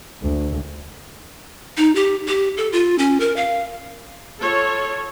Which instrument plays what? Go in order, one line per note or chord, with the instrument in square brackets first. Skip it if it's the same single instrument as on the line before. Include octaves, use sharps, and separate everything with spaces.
[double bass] D2
[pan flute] D#4
G4
G4
A4
F4
C#4
A#4
F5
[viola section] F4 A4 C#5